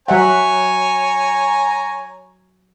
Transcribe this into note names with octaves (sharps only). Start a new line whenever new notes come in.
F#3 C#5 E5 F#5 G#5 A#5